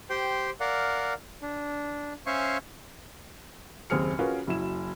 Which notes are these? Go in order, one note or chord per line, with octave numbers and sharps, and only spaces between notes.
G4 C5 G5 C6
A#4 D5 F5 F#5
D4
C#4 C5 E5 F5 G#5 C#6
F#1 D#2 C4 G#4 F6 C#7
C#4 F4 F#4 G#4 A#4 B4
F#1 F#3 E4 E7